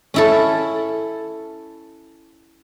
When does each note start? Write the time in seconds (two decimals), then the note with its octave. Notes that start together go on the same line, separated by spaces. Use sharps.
0.14 C#4 E4 A4